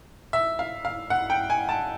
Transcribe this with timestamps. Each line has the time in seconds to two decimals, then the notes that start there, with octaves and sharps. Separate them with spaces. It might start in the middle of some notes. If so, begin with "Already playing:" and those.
0.33 E5
0.59 F5
0.85 F5
1.10 F#5
1.30 G5
1.50 G#5
1.69 A5